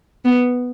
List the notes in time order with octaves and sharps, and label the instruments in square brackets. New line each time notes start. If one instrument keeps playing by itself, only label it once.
[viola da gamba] B3